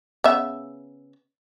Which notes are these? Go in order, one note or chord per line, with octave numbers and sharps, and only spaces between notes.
C#3 B3 E5